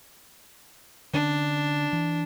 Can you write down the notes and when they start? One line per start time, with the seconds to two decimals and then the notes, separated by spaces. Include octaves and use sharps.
1.13 D3 C#4 D4
1.93 E3